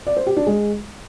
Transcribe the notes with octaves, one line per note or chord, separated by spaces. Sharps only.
D5
C5
G4
D4
G#3